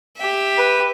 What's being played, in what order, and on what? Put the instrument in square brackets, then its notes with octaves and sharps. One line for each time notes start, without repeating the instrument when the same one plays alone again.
[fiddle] G4 E5
[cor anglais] B4